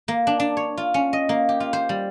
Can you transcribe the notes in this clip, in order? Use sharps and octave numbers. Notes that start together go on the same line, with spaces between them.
A#3
D4
D4
C#5
F4
C#4
D#5
A#3
G4
F4
C5
G3